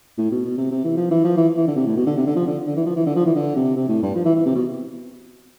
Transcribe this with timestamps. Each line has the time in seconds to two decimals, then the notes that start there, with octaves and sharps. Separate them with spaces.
0.18 A2
0.31 B2
0.45 B2
0.58 C3
0.71 C3
0.84 E3
0.97 F3
1.11 E3
1.24 F3
1.37 E3
1.57 E3
1.67 D3
1.76 C3
1.86 A2
1.97 B2
2.06 D3
2.17 C3
2.27 D3
2.36 F3
2.47 D3
2.66 D3
2.76 E3
2.86 F3
2.96 E3
3.06 D3
3.16 F3
3.26 E3
3.35 D3
3.56 C3
3.76 C3
3.89 A2
4.03 G2
4.15 F3
4.25 E3
4.36 E3
4.45 C3
4.55 B2